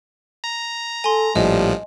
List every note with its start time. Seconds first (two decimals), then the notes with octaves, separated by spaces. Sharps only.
0.44 A#5
1.04 A4 G#5 C6
1.35 A#1 A2 F3 G3 D#5